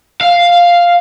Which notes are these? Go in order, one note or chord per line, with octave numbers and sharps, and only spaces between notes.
F5